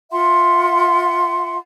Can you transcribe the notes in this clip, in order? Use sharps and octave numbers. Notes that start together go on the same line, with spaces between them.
F4 E5 F#5 C6